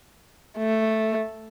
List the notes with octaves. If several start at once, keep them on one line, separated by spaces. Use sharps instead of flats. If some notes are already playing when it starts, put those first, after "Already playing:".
A3